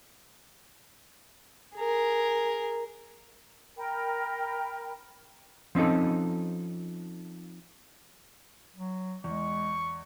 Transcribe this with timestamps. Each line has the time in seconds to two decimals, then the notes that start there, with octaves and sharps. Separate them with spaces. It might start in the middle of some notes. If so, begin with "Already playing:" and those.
1.76 G#4 A#4
3.77 A#4 G5 B5
5.75 F3 C4 C#4 D#4 A4
8.75 F#3
9.24 E2 G#3 C#6